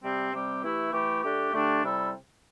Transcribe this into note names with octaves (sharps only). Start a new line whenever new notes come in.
C3 G3 C4 G4
C3 G3 C4 G4
E3 A3 E4 G4
E3 A3 E4 G4
D3 A3 D4 G4
D3 A3 D4 G4
C3 G3 E4 A4